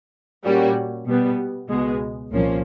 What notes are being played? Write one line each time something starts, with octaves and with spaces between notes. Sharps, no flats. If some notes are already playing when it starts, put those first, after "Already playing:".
A#2 G3 A#3 C#4 F#4
B2 G3 B3
C#2 B2 G#3 B3
C2 A#2 F3 A#3 C#4